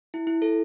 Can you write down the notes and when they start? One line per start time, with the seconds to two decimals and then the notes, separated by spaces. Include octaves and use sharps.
0.14 E4
0.27 E4
0.42 A4